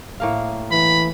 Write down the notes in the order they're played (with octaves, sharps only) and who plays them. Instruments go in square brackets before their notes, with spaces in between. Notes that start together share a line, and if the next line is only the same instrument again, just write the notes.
[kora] A2 A#3 F5
[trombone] E3 [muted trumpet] B5